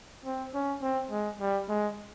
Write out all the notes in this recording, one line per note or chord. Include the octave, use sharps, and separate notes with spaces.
C4
C#4
C4
G#3
G3
G#3